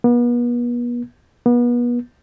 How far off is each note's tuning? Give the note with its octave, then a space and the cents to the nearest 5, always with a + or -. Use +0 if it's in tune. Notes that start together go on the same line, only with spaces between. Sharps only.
B3 -40
B3 -35